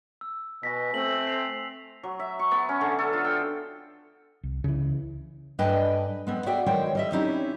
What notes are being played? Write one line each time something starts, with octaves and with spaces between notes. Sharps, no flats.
E6
B2 G#5 A#6 B6
A3 C4 E6 F#7
C7 F7
F#3
E5
C#6
B3
C#4
D3
A4
F4
G5
C2
C#2 C#3 E3
G2 D4 B4 D#5 G5 G#5
G#3 B3 C4
F#4 G#4 D5 E5 F#5 G5
D#3 E3 G#3 C5 C#5 G5
G3 D#5 E5
C4 C#4 D#4 E4 G4